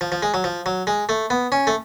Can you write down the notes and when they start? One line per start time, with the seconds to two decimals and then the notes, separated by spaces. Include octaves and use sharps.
0.01 F3
0.12 F3
0.23 G#3
0.34 F#3
0.44 F3
0.66 F#3
0.87 G#3
1.09 A3
1.30 B3
1.52 C#4
1.67 A3